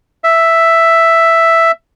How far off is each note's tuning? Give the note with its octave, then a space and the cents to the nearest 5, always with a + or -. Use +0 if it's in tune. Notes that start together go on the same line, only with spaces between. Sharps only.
E5 +5